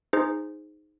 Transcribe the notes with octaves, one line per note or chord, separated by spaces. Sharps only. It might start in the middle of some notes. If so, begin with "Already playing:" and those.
D#4 G#4 C5